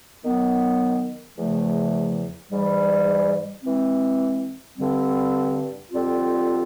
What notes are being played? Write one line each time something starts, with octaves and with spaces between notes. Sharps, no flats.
D#3 F#3 B3
E2 C#3 F3 A3
G#2 E3 G3
E3 G#3 C4
G2 D3 G3 C4
F2 D3 G3 C4 F4